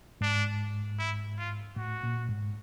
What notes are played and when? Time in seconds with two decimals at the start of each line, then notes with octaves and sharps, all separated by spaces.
0.21 G#2 D4
0.99 E4
1.38 F4
1.76 A2 F#4
2.03 A#2
2.29 G#2